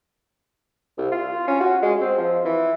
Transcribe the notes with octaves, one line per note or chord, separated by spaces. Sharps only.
C2
F4
C#4
F#4
G#3
C4
F3
E3